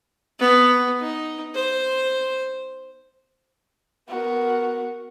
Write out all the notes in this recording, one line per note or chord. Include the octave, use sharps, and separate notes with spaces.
B3
D#4
C5
B3 F#4 A#4